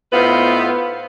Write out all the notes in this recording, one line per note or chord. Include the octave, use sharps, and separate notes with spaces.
A2 B3 D#4 F4 B4 C5